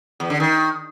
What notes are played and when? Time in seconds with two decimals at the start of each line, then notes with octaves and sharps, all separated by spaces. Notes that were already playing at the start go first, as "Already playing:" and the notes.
0.20 E2
0.30 D3
0.40 D#3